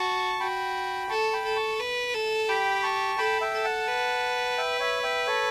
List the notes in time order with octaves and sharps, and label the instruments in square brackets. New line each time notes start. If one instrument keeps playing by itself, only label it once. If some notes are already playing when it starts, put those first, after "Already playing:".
Already playing: [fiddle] F#4 [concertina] A5 C#6
[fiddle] F#4 [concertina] G5 B5
[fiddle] A4 [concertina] A5 C#6
[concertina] G5 B5
[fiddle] A4
[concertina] A5 C#6
[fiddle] B4
A4
[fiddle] G4 [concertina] G5 B5
[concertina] A5 C#6
[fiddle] A4 [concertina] G5 B5
[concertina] E5 G5
[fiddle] A4
[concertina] F#5 A5
[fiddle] B4
[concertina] E5 G5
C#5 E5
E5 G5
A4 C#5